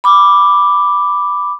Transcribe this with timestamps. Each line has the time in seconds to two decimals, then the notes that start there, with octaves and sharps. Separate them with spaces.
0.04 B5 D6